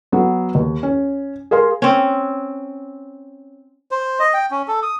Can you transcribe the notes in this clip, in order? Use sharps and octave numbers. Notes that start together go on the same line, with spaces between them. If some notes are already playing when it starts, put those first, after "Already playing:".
F#3 B3
D#2
C#4
G#4 A#4 F5 C6
C4 C#4
C5
D#5
G5
C#4
A4
D#6